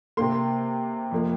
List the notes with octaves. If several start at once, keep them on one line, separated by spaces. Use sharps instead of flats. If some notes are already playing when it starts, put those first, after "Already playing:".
C3 A#3 C6
F2 F3 A#3